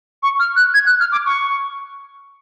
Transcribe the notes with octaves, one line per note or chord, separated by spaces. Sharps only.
C#6
F6
F#6
G#6
F#6
F6
D6
C#6